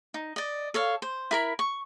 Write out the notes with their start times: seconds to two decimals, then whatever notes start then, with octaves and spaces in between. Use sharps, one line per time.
0.14 D#4
0.36 D5 D#5
0.74 A4 C#5 F5
1.02 C5
1.31 E4 A#4 B5
1.59 C#6